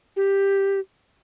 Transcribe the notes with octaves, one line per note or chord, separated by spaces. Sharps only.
G4